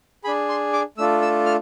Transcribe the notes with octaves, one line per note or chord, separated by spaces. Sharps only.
D4 G#4 B5
C6
D6
A3 D4 F4 A4 E6
E6
F6